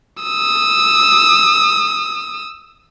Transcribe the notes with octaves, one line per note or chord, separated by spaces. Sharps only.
D#6 E6